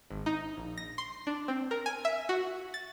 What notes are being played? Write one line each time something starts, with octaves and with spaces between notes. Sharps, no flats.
G#1
D#4
A#1
A#6
C6
D4
C4
A#4
G#5
E5
F#4
A6